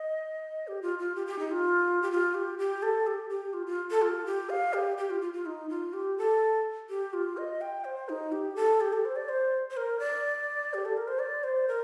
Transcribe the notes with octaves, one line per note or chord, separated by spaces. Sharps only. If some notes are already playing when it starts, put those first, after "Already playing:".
Already playing: D#5
G4
F4
F4
G4
G4
D#4
F4
G4
F4
G4
G4
A4
G4
G4
F4
F4
A4
F4
G4
F5
G4
G4
F4
F4
F4
D#4
F4
G4
A4
G4
F4
D#5
G5
C5
D#4
G4
A4
G4
A4
C5
D5
C5
C5
A#4
D5
G4
A4
A#4
C5
D5
C5
A#4